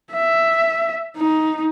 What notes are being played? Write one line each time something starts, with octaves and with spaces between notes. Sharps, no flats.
E5
D#4